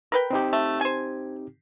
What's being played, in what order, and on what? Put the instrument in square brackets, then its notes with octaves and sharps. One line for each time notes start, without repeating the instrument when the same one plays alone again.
[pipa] A#4 B4 G5
[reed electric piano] C4 D#4 G4
[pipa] A3
C5 G#5